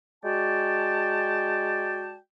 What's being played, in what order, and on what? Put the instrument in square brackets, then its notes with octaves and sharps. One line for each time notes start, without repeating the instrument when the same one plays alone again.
[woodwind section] G#3 F#4 D5 G5 A5